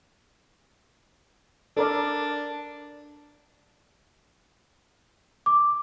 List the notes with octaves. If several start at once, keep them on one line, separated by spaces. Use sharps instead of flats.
D4 A4 A#4 D5
D6